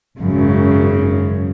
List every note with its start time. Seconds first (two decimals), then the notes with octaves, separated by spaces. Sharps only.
0.18 G#1 F#2 C#3